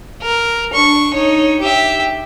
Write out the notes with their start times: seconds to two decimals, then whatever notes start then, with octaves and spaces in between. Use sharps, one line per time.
0.22 A#4
0.74 D4 C#6
1.14 D#4 C#5
1.59 G4 E5